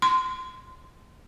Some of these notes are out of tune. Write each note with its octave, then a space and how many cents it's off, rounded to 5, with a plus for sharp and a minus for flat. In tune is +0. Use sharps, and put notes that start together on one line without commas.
C6 -25